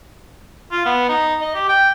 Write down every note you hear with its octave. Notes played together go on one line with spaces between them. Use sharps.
F4
B3
D#4
D#5
G4
G5